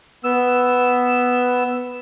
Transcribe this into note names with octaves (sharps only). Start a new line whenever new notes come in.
B3 E6